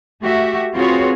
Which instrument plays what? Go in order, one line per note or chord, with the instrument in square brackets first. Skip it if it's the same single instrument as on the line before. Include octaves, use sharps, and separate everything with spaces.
[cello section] A3 F#4 G4 E5
C4 F4 F#4 G#4 B4 C#5